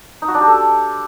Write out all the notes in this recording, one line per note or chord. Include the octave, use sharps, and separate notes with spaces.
D#4
F#4
D4
G4
A4